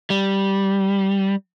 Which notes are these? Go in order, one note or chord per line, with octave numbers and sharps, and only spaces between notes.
G3